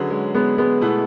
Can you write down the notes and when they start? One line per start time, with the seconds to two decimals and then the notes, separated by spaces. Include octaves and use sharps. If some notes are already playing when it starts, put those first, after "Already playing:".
Already playing: D3 F#3 C#4 G#4 B4
0.10 G#3
0.34 G#3 B3
0.58 G#3 B3
0.81 B2 A3 E4 B4